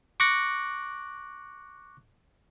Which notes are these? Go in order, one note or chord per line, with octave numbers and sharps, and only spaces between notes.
C#6 D6 F#6 A#6 C#7